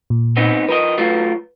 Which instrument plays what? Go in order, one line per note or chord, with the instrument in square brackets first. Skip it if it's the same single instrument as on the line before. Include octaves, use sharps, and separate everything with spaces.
[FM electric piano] A#2
[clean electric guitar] B3 C4 D#4
[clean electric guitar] F3 A#4 D#5 [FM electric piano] B4
[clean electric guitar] F#3 A3 F4